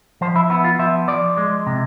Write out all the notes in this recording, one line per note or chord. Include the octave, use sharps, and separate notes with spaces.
F3 C5
E4
B3 E4
F4
F3 E5
F3 D5
G#3
C3